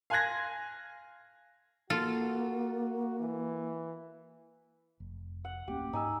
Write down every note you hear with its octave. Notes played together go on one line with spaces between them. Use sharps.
F5 G#5 C6 F#6 G#6 A#6
A#3 F4 F#4 A4
E3
F1
F#5
D1 A#3 C#4 G4
G#2 D#4 G#5 E6